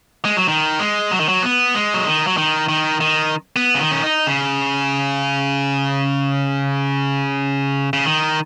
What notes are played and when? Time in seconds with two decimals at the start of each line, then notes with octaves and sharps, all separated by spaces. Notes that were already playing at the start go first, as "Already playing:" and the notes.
0.25 G#3
0.37 F#3
0.48 D#3
0.79 G#3
1.12 F#3
1.20 D#3
1.29 F#3
1.43 B3
1.75 G#3
1.94 F#3
2.06 D#3
2.27 F#3
2.37 D#3
2.69 D#3
3.01 D#3
3.56 B3
3.75 C#3
3.80 D#3
3.91 C#4
4.04 D#4
4.27 C#3
7.93 C#3
8.05 D#3